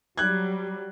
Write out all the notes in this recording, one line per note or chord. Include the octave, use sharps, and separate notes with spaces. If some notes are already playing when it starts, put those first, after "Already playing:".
F#3 G3 F#6 G#6